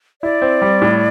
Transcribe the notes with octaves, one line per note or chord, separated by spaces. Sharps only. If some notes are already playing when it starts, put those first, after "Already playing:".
E4 D5
C4
G3
A2